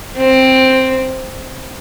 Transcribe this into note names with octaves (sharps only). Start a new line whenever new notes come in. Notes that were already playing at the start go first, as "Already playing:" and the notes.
C4